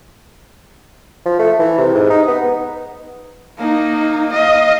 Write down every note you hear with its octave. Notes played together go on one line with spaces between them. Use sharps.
F3
A3
E3
C3
G#2
D#4
B3
A#3 D#4
D#5 F5